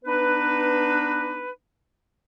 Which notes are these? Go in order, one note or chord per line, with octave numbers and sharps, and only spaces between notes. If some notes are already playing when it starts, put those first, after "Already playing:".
B3 D4 D#4 B4